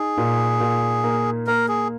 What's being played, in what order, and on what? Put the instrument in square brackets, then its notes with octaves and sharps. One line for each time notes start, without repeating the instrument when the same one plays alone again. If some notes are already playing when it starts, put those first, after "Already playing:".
Already playing: [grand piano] D#4 [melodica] G#4
[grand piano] A#2
A#2
A#3
[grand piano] A#3 [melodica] A#4
[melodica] G#4